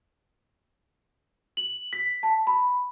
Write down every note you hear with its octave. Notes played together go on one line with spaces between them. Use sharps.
F#7
B6
A5
B5